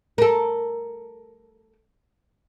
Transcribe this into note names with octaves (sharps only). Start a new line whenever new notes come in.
A4 A#4